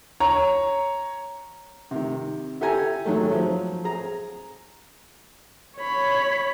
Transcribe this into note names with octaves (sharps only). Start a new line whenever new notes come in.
C#5 A#5
C3 D#3
E4 G4 A4 G#5 A#5
D#3 F#3 G#3 A3
F3 F#3
G#4 A#5
C#5 B5